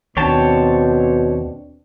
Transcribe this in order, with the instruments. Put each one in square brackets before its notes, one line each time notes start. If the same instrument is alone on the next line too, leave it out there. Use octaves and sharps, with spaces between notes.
[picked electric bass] D#2 [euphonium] B2 [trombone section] C4 D4 [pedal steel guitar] C#5 G5 A5